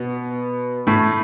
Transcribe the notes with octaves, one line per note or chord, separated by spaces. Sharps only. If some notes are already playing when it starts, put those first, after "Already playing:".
Already playing: B2 B3
A2 A3